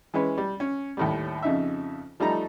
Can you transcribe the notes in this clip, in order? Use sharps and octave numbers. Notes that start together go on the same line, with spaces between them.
E3 G#3 C#4 B4
G3
C#4
D#2 A2 G3
F2 C#3 D#4 E5
F3 G3 A3 D#4 A#5